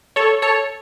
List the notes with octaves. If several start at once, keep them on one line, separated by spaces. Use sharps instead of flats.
A4 C#5
A4 C#5